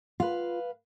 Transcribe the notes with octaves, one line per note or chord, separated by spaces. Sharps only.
F4 B4 F5